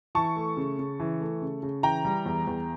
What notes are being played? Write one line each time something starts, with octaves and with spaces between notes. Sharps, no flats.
E3 A5 C#6
A3
C#3
C#3
E3
A3
C#3
C#3
E3 G5 A#5
G3
E2
E2